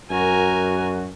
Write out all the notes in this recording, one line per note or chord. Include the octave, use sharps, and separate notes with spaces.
F#2 F#4 A#4 G#5